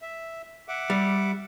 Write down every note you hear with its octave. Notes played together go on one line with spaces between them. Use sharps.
E5
E5 F#5 D6
G3